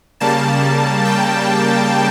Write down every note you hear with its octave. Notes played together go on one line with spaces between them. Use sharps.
C#3 G3 A#3 A5
G5